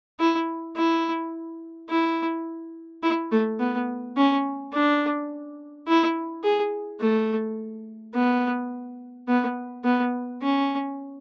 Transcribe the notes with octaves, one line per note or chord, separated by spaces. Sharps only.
E4
E4
E4
E4
A3
B3
C#4
D4
E4
G#4
A3
B3
B3
B3
C#4